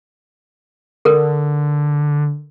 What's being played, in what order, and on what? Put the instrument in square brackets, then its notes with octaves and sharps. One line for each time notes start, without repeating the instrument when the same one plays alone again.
[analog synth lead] D3 [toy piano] A4 A#4